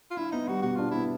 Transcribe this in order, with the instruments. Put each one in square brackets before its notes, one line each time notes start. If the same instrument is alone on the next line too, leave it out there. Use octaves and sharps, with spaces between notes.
[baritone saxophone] F4
[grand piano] D4 [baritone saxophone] E4
[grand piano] B3 [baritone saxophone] D#4
[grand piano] G3 [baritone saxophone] F#4
[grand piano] B2 [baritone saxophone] F#4
[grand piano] D4 [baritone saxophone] F4
[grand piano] B3 [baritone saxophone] E4